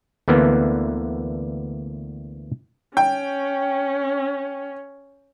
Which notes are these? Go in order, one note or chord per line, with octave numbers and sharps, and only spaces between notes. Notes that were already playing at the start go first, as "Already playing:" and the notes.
D2 D3 E3 A#3 B3
C#4 G5